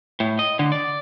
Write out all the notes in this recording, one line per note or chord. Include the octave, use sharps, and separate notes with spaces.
A2
D#5
D3
D5